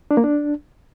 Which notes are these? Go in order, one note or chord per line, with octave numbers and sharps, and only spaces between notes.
D4
A#3
D4